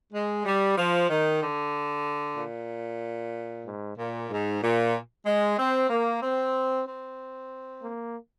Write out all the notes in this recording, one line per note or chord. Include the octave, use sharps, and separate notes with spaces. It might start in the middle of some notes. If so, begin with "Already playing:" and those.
G#3
G3
F3
D#3
D3
A#2
G#2
A#2
G#2
A#2
G#3
C4
A#3
C4
C4
A#3